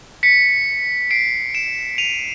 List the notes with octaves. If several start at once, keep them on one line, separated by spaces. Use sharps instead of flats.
B6 C#7
C7 D7
D7 E7
D#7 F7